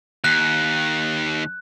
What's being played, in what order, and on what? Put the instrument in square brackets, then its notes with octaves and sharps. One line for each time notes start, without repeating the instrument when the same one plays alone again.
[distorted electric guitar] D#2 [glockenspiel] F#6